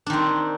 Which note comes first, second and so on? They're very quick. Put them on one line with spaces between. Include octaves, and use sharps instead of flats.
D4 D#3 C4